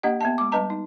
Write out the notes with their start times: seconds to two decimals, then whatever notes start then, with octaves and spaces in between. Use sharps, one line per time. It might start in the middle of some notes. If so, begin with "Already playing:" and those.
0.03 A#3 D4 G4 D#5 F#5
0.21 B3 E5 A5
0.38 G#3 D6
0.52 G3 D4 B4 D#5 A5 A#5
0.70 D#4